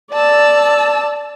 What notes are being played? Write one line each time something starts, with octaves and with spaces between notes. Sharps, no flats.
D5 A5 E6